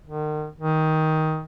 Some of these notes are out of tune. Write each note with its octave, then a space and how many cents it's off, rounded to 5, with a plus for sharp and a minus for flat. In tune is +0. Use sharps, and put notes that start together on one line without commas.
D#3 -40
D#3 +15